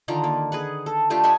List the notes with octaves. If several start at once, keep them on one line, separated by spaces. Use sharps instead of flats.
D3 D#3 F4 A#5
A#3
G#4 B4 F#5
A4
A3 D4 F4 G4
D#5 E5 F#5 G#5